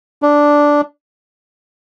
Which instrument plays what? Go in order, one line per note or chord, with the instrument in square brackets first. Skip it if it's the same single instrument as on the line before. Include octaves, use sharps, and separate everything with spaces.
[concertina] D4